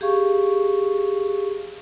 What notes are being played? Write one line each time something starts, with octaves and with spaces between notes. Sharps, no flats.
G4 G#4 F5 C#6